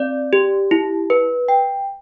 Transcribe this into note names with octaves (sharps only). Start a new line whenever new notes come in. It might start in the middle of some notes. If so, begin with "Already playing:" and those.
Already playing: C4 D5
G4
E4
B4
G5